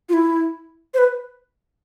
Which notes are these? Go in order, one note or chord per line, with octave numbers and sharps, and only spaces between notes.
F4
E4
C5
B4